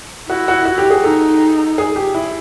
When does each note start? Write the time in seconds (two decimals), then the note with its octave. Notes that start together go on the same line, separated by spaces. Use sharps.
0.29 E4 F#4
0.48 F#4
0.65 F#4
0.78 G4
0.90 G#4
1.04 D#4 A4
1.78 G#4
1.96 G4
2.15 E4